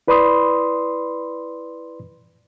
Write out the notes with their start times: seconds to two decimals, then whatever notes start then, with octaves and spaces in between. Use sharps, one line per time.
0.08 E4 B4 D5 B5 C6 D#6